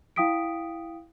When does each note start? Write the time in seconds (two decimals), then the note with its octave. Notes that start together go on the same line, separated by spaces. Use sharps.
0.16 E4 F5 G5 D#6 B6 D7